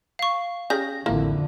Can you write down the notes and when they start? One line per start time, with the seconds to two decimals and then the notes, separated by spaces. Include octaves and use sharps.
0.19 F5 C#6
0.70 C#4 G4 G#4 G6 A#6
1.06 A1 F2 D3 A#3 E4